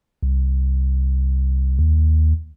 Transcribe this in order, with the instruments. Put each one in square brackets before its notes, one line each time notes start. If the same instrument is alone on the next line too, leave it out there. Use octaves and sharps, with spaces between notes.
[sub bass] C2
D#2